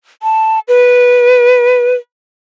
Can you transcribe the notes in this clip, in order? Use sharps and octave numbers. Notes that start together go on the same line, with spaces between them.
A5
B4